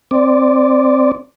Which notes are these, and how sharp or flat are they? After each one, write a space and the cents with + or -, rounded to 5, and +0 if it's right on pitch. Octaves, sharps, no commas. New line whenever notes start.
C4 +0 D5 +0